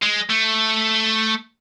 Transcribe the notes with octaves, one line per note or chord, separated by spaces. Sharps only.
G#3
A3